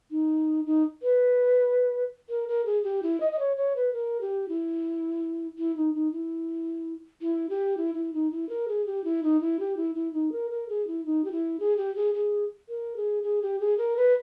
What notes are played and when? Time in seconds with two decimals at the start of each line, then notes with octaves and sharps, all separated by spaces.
0.11 D#4
0.66 D#4
1.03 B4
2.29 A#4
2.48 A#4
2.66 G#4
2.84 G4
3.03 E4
3.20 D#5
3.32 D#5
3.39 C#5
3.57 C#5
3.76 B4
3.93 A#4
4.21 G4
4.49 E4
5.58 E4
5.76 D#4
5.94 D#4
6.12 E4
7.22 E4
7.50 G4
7.77 E4
7.94 E4
8.14 D#4
8.32 E4
8.49 A#4
8.68 G#4
8.86 G4
9.04 E4
9.23 D#4
9.41 E4
9.60 G4
9.77 E4
9.95 E4
10.13 D#4
10.32 A#4
10.51 A#4
10.69 G#4
10.87 E4
11.05 D#4
11.25 G4
11.32 E4
11.60 G#4
11.77 G4
11.96 G#4
12.14 G#4
12.69 A#4
12.96 G#4
13.23 G#4
13.42 G4
13.60 G#4
13.78 A#4
13.97 B4